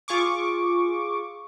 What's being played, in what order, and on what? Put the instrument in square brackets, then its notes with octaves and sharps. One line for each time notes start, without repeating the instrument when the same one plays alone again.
[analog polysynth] F4 G#4 C#6 D6